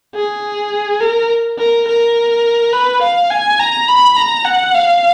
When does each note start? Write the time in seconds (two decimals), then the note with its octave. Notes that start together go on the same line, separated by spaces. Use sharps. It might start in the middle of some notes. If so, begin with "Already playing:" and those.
0.15 G#4
1.01 A#4
1.58 A#4
1.87 A#4
2.73 B4
3.02 F5
3.30 G#5
3.59 A#5
3.88 B5
4.17 A#5
4.45 F#5
4.75 F5